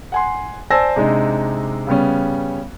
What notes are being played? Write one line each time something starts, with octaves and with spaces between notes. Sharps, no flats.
F#5 G#5 C6
C5 D5 G#5 A5 E6 A#6
C3 G#3 D4 D#4
C#3 G3 B3 C#4